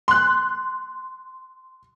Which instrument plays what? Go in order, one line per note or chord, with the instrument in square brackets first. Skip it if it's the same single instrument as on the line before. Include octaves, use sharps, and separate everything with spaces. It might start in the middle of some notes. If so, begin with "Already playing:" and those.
[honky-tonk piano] C6 F#6